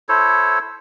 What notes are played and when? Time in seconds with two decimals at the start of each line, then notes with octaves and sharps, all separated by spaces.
0.09 E4 A4 C5 C#5